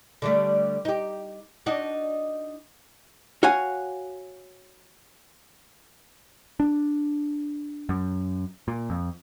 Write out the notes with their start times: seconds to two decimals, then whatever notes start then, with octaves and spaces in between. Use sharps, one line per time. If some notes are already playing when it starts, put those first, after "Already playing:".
0.22 D3 G3 A3
0.85 D#4 G4
1.66 D4 D#4 F#4
3.43 F#4 C#5 F5 F#5 G#5
6.60 D4
7.89 F#2
8.68 A#2
8.90 F2